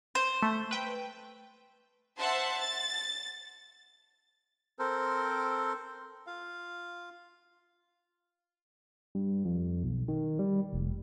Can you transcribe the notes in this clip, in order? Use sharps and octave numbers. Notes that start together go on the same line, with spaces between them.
C5
A3
B4 G5
C5 E5 F#5 A5 C6
A6
C4 A4 A#4 C5
F4 F5
G2
F2
B1
D#3
G3
F1